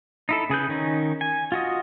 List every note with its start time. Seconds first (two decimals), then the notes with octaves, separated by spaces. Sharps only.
0.29 D#4 E4 A4
0.50 C#3 G#4 B4 G6
0.69 D#3 C#4 D#4
1.21 G#5
1.52 F4 F#4 D#5